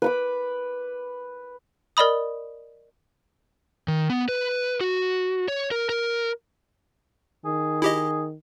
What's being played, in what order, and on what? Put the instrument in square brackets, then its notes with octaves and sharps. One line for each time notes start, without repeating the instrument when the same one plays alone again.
[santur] B4 B5 D6
[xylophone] A#4 D5 D#5 B5 D#6
[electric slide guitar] D#3
B3
B4
F#4
C#5
A#4
A#4
[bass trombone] D#3 [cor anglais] G#4
[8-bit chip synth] E4 G4 D#5 [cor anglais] G#4